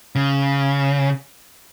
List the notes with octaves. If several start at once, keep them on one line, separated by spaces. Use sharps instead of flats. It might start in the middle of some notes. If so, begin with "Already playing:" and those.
C#3